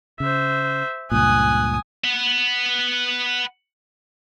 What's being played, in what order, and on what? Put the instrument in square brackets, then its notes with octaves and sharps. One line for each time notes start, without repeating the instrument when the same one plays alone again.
[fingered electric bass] C#3 [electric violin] C5 E5
[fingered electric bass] C#2 G2 A#2 [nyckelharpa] G#5 D#6 [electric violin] F#6
[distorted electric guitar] B4 F#5